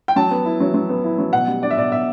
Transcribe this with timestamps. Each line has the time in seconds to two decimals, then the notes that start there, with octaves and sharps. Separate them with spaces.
0.08 G5
0.16 F#3 A5
0.31 B3
0.45 E4
0.60 F#3
0.74 F#3
0.89 B3
1.04 E4
1.18 F#3
1.33 B2 F#5
1.47 G3
1.62 D4 D5
1.71 E5
1.77 B2 D5
1.92 B2 E5